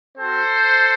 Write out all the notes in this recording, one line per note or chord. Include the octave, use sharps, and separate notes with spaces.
C4 F#4 A4 C5